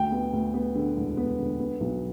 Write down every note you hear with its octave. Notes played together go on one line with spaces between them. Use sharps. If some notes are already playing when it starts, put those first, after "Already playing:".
Already playing: D2 G5
B3
D2
B3
D3
E1
B3
D3
B3
B1